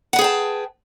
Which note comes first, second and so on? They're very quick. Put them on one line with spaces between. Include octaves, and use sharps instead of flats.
F#5 B4 G#4 G5 A5